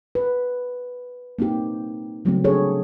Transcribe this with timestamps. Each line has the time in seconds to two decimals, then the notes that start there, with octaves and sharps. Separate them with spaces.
0.15 B4
1.39 A#3 C4 D#4 G4
2.25 C#3 F#3 G3 A3 B3 C4
2.44 D4 G#4 A4 C#5